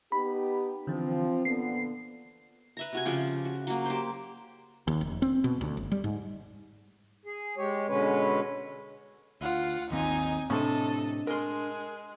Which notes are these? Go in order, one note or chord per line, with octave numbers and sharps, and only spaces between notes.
B3 D#4 G4 B5
D3 E3 F3 C4
A#2 D3 B3 C7
B4 E5 A#5
C3 F#4 G#5
C#3 F3 G4
F#4
F#3 A#3
G4 C5
D#2
F1
C4
B2
D2
G1
G3
G#2
G#4
G#3 G4 C#5
B2 D3 G#3 C#4 B4 C#5
D2 F4 F#5
G#1 D#2 C4 D#4 G#5
A2 C3 C#4 D4 A4 D#5
G#3 A#4 C6